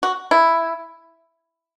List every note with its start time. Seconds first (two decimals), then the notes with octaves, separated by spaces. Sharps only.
0.03 F#4
0.31 E4